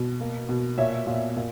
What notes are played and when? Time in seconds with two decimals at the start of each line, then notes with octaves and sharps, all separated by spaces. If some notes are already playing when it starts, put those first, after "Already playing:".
Already playing: B2
0.21 A#3
0.49 B2
0.78 A#2 C#5 E5
1.07 A#2
1.36 A#2